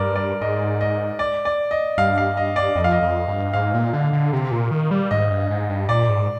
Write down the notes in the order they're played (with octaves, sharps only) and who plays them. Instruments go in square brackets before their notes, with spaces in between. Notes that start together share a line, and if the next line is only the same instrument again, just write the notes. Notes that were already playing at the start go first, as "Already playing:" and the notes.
Already playing: [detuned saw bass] G2 [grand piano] A#4 D5
[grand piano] D5
[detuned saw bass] G#2 [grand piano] D#5
[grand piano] D#5
D5
D5
D#5
[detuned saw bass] G2 [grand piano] F5
[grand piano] F5
D#5
D5
[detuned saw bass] F2 [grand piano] D#5
[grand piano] F5
D#5
[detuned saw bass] F2
G2
[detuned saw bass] G#2 [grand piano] F5
[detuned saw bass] A#2
D3
D3
C3
A#2
D#3
G3
[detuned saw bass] G#2 [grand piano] D#5
[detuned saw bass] G2
G#2
G2
[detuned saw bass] A#2 [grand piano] D5
[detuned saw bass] G#2